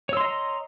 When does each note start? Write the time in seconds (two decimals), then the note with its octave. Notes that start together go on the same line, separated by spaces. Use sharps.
0.09 C#5
0.13 E6
0.17 C6
0.21 D#5
0.25 A#5